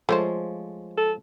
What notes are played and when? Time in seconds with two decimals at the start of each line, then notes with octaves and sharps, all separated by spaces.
0.09 F3 G#3 A3 F4 C5 C#5
0.97 A4